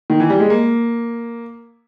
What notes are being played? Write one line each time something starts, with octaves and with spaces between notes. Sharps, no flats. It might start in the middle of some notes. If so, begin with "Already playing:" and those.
D#3
E3
G3
G#3
A#3